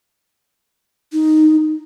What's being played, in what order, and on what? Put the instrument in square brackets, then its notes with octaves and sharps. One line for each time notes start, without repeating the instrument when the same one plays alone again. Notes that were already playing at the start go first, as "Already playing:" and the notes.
[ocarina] D#4